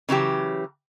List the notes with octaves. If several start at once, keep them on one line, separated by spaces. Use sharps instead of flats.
C#3 E3 F#3 G4